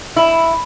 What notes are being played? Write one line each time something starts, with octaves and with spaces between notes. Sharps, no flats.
E4